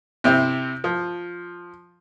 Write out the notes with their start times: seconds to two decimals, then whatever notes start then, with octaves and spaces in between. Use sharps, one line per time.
0.24 C3 C4 E4
0.84 F3